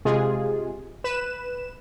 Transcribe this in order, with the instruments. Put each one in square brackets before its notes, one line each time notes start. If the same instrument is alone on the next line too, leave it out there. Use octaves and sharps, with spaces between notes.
[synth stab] C3 G#3 F4 G#4
B4 E7